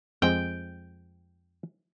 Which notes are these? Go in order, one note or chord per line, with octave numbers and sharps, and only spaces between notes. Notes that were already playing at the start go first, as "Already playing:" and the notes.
F2 G#3 C4 G5